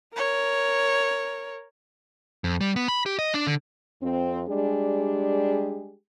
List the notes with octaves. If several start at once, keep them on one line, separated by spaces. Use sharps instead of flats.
A#4 C#5
F2
G3
B3
B5
G4
D#5
D4
D3
F2 C4
G3 G#3 D4 G4 G#4